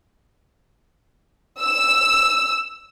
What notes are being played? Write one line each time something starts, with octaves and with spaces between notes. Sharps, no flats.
E6